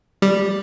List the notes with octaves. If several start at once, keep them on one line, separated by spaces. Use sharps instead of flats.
G3